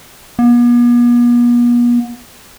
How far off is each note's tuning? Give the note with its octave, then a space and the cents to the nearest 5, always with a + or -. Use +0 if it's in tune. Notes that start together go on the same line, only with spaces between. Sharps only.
B3 -45